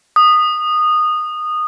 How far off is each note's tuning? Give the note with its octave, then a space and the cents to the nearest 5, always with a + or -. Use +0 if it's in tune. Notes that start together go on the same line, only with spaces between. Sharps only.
D#6 -15